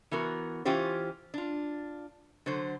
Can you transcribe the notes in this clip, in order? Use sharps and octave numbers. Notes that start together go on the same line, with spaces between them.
E3 B3 F#4 A#4
E3 C#4 F4 G4 C5
D4 F4
D3 F#3 C5